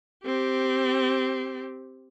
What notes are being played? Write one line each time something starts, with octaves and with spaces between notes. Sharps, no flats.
C4 G4